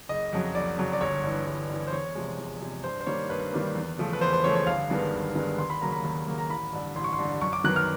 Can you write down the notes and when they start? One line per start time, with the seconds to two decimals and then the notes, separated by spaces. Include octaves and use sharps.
0.09 F#1 D#5
0.33 F2 C#3 F#3
0.55 F#1 D5
0.78 F2 C#3 F#3
0.93 D5
1.01 G1 C#5
1.24 G2 E3
1.46 G1
1.70 G2 E3
1.87 C5
1.92 E2 C#5
2.15 C3 F3 G#3
2.38 E2
2.60 C3 F3 G#3
2.84 G2 C5
3.01 C5
3.06 D#3 G3 A#3 C#5
3.30 G2 B4
3.52 D#3 G3 A#3
3.75 E2
3.98 C#3 F3 A3
4.13 B4
4.21 E2 C5
4.33 C5
4.44 C#3 F3 A3 C#5
4.55 C#5
4.67 G1 F5
4.90 G2 D#3 G#3 B3
5.13 G1
5.36 G2 D#3 G#3 B3
5.58 D#2 C6
5.70 B5
5.81 C#3 F#3 A#3 A#5
5.92 B5
6.04 D#2
6.27 C#3 F#3 A#3
6.38 A#5
6.50 A1 B5
6.73 G2 D3
6.95 A1 C6
7.04 C#6
7.13 C6
7.19 G2 D3
7.41 F#2 C#6
7.53 D6
7.64 D#3 F#3 B3 F#6
7.76 F6